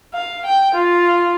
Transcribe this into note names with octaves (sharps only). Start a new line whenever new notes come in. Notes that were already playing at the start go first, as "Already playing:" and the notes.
F5
G5
F4